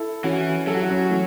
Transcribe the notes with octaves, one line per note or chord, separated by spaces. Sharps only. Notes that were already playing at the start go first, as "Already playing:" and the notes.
Already playing: E4 A4
E3 C#4 F#4
F#3 A4
F#4
E4
C#4 F#4
E3 A3